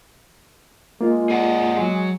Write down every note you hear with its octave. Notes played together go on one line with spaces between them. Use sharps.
G#3 A#3 F4
G#4 D5 F#5
F#3